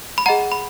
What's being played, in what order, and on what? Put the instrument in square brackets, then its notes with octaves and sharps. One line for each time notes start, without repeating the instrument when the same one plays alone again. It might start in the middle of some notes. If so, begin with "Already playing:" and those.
[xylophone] B5
G#4 D#5 F#5 A#5
B5